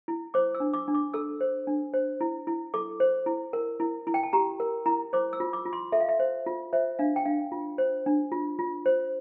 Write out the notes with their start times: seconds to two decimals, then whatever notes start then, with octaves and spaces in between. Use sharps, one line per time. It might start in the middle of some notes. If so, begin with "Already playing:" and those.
0.08 E4
0.34 C5 D6
0.55 E6
0.60 D4
0.73 D6
0.88 D4
0.94 D6
1.14 A4 E6
1.41 C5
1.67 D4
1.94 C5
2.21 E4
2.47 E4
2.74 A4 D6
3.00 C5
3.26 E4
3.53 A#4
3.80 E4
4.07 E4
4.14 G5
4.23 A5
4.33 G4 A#5
4.60 A#4
4.86 E4 A#5
5.13 C5 D6
5.33 E6
5.40 F4
5.53 D6
5.66 F4
5.73 C6
5.92 A4 E5
6.01 F5
6.09 E5
6.20 C5
6.46 F4
6.73 C5 E5
6.99 D4 F5
7.16 G5
7.25 D4 F5
7.52 F4
7.78 C5
8.06 D4
8.32 F4
8.59 F4
8.86 C5